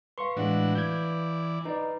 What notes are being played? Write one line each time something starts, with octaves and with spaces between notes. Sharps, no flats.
B4 F5 C6 C#6
A2 E3 G#3 D4 F#4
E3 D5 G6 G#6
D#4 B4 D5